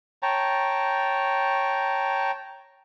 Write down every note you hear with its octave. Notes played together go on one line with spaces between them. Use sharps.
C#5 G5 A5 A#5